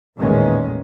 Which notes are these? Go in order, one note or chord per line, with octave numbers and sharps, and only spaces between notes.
A1 E2 A#2 D#3 G#3 C#4